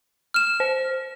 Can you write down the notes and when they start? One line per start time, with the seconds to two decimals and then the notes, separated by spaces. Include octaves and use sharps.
0.34 F6 E7
0.60 C5